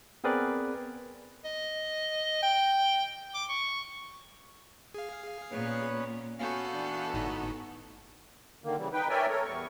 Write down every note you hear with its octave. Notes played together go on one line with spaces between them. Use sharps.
B3 C4 G#4 A#4 B4 D5
D#5
G5
D6
C#6
G#4 F5
A#2 B3 C#4 B4 C#5
B3 C#4 F#4 A4 F5 G6
E3 D4
G1 A2 D#4
D3 D#3 A#3
C#3 E3 G3
D#4 B4 G5
A#4 C#5 D5 E5 G5 G#5
A3 A4 A#4 C#5
E2 G3 B3 C#6